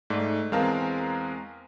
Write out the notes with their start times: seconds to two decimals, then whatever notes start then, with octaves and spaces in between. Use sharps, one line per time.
0.10 G#2 A3 D5
0.52 E2 G#3 C4 A#4 F5 A5